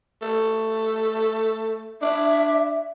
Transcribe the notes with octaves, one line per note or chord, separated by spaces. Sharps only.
A3
D4 E5